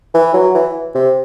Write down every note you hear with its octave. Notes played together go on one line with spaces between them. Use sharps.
E3
F#3
E3
C3